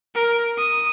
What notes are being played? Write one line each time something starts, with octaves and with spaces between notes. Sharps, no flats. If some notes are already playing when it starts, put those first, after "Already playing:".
A#4
D#6